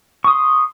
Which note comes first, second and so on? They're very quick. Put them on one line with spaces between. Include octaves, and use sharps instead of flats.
C#6 D#6 C6